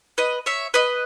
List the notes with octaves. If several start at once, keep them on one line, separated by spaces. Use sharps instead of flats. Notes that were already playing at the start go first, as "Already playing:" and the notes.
B4 D#5
C#5 E5
B4 D#5